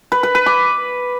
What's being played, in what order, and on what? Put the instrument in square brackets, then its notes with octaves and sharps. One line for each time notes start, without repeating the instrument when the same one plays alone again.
[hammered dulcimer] B4
B4
B4
D6